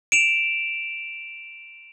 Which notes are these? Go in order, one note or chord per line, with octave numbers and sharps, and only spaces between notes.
D7 E7 F7